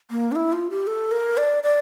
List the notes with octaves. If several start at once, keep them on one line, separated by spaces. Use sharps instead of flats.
A#3
D4
E4
F4
G4
A4
A#4
D5
D5